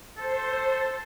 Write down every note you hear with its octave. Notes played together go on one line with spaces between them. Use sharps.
A4 C5